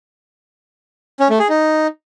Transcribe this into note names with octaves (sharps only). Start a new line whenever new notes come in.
C#4
A3
G#4
D#4